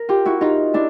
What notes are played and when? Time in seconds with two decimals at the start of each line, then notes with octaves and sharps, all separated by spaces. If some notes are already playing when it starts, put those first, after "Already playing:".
Already playing: A#4
0.09 F4 G4
0.25 E4 F#4
0.41 D#4 F4
0.74 D4 E4